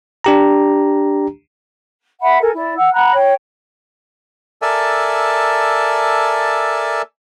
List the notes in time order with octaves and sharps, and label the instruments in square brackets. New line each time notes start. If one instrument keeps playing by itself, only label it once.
[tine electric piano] D4 G4 A#5
[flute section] E5 F#5 B5
A4 A#4 G#5
E4 D5
F#5 E6
F#5 A#5 B5 F#6
C#5 G5
[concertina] A4 A#4 D5 E5 G#5 A5